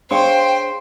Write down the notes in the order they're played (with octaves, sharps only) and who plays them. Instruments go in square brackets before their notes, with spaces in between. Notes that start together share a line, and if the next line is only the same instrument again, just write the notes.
[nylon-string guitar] D4 G#4 C#5 [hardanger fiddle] C5 [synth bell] F5 C6 [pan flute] G5